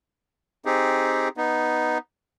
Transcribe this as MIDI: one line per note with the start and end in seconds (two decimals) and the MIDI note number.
0.65 1.29 60
0.65 1.29 63
0.65 1.29 67
0.65 1.29 68
1.37 1.98 59
1.37 1.98 63